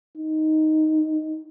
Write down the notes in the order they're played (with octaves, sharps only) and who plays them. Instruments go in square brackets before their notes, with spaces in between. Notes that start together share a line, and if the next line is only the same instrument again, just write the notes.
[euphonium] D#4